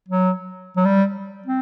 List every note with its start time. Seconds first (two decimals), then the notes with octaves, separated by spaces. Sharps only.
0.08 F#3
0.76 F#3
0.85 G3
1.46 C4